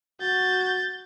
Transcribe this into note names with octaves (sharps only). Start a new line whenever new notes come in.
F#4 G6 A6